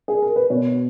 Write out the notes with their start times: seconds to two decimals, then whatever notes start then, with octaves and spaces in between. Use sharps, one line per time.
0.08 G#4
0.22 A#4
0.36 B4
0.50 B2 C#5